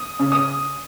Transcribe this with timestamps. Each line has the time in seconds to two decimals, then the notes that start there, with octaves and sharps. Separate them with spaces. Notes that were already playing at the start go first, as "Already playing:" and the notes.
Already playing: D#6
0.19 C#3
0.32 D#6